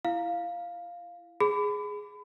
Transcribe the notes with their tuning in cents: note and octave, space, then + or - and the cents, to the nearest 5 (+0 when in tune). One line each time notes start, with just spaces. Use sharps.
E4 +25 F5 +0
G#4 +0 B5 +25